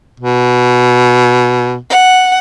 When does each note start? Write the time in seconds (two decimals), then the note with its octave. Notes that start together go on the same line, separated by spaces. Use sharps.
0.20 B2
1.90 F#5